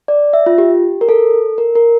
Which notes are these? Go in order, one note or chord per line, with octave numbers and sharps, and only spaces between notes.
D5
E5
F4
G4
A#4
A4
A#4
A#4